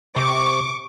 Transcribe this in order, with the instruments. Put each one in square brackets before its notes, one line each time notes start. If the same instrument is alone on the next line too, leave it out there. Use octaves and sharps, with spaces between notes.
[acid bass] C3 [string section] C#6 D6